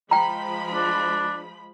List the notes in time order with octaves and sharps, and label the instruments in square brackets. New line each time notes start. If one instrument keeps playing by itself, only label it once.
[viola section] F3 G#3 B5 [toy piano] G5 A#5
[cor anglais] D4